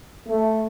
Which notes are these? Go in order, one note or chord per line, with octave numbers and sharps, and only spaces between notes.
A3